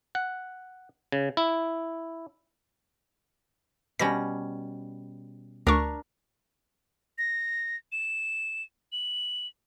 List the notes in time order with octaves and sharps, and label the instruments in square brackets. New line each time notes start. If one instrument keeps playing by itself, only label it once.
[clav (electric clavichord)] F#5
C#3
E4
[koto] B2 G3 C#4 [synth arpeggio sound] A#6
[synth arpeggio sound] D2 C#6 [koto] D4 A#4
[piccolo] A#6
E7
F#7